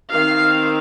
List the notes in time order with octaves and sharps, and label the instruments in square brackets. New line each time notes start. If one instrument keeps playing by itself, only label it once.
[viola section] D#3 C4 F5